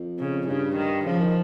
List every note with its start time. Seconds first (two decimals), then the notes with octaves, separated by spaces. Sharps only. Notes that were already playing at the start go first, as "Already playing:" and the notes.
Already playing: F2
0.19 C#3
0.48 G2 C#3
0.76 D#3
1.05 C#3 F3
1.21 D#3